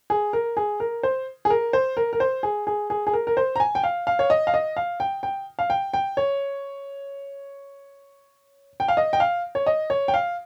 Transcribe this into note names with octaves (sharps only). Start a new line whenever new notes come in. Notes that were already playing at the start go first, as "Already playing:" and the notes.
G#4
A#4
G#4
A#4
C5
G#4
A#4
C5
A#4
A#4
C5
G#4
G#4
G#4
G#4
A#4
A#4
C5
A#5
G#5
G5
F5
F5
C#5
D#5
F5
D#5
F5
G5
G5
F5
G5
G5
C#5
G5
F5
D#5
G5
F5
C#5
D#5
C#5
G5
F5